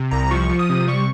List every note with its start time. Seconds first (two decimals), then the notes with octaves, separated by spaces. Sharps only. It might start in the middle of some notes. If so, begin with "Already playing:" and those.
Already playing: C3
0.11 C2 A#5
0.31 F3 C#6
0.49 F3
0.59 D#6
0.69 C3
0.87 G3 C#6